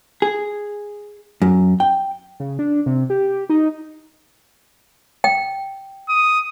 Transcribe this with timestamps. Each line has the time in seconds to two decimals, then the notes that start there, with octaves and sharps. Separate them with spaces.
0.22 G#4
1.42 F#2
1.80 G5
2.40 C#3
2.59 D4
2.86 C3
3.10 G4
3.49 D#4
5.24 G5
6.09 D#6